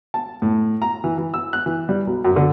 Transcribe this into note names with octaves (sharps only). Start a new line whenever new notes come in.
A5
A2
A#5
E3
E3
E6
F#6
E3
G3
B1
F#2
D3